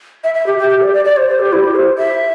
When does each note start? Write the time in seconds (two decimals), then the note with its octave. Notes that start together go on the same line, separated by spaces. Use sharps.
0.24 E5
0.34 E5
0.46 G4
0.58 G4
0.70 G4
0.82 D5
0.93 D5
1.04 D5
1.17 C5
1.29 C5
1.40 G4
1.53 E4
1.64 G4
1.75 C5
1.98 E5